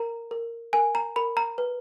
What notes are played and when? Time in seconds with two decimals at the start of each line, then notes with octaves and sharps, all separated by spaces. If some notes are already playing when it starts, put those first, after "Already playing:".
Already playing: A#4 A#5
0.31 A#4
0.73 A#4 G#5
0.95 A#5
1.16 A#4 B5
1.37 A#5
1.58 B4